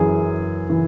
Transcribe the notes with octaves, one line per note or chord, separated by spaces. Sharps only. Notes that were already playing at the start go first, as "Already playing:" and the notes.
Already playing: F#2 E3 G#4
E3